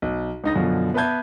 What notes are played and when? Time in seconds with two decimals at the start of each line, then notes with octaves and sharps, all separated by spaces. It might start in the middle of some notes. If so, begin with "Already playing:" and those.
0.02 B1
0.44 C#2 D#4 A#6
0.56 F#2 B2 D3 F3
0.94 B3 B4 E5 A5 G6 G#6